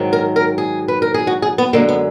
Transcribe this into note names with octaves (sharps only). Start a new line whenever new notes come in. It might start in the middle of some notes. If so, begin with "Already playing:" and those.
Already playing: G#2 D#3 F#3
A#4
A#4
G#4
B4
A#4
G#4
F#4
G#4
B3
F#2 D3 G#3 A#3
B3